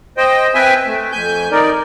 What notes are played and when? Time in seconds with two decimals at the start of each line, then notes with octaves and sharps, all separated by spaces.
0.17 C5 D#5 G5
0.55 C4 B4 E5 G5 G#5
0.86 A3
1.12 F2 G#5 G6
1.51 D#4 A#4 D5